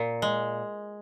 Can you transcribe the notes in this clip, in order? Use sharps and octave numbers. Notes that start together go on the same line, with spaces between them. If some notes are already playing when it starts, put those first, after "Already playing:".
Already playing: A#2
G#3